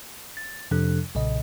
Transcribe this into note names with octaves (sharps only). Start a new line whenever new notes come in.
A6
F2 C3 F3 D4 A4 F#6
B1 A#2 C#3 D#5